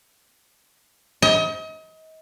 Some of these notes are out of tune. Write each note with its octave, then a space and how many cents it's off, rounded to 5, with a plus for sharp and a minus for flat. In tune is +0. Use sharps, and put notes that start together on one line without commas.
D#5 +35